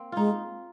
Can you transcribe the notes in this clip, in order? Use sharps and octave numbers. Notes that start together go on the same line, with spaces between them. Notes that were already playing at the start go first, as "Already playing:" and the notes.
Already playing: A#3 C4
G#3 D#4 F4